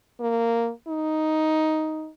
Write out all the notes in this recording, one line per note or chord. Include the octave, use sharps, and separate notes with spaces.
A#3
D#4